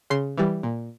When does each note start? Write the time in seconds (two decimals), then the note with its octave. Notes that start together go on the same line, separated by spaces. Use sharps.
0.10 C#3 C6
0.37 E3 G3
0.63 A#2